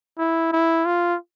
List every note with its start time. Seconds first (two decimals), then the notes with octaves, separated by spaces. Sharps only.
0.18 E4
0.52 E4
0.86 F4